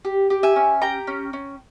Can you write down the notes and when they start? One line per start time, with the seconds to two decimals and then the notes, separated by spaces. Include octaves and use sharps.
0.05 G4
0.30 G4
0.43 E5 G#5
0.56 C#4
0.82 G4 G5 A#5
1.07 C#4
1.33 C#4